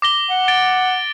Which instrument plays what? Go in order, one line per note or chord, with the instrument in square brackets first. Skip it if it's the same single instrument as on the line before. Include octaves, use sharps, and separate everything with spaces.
[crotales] D6 A#6 G7
[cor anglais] F#5
[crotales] A6 D7 G7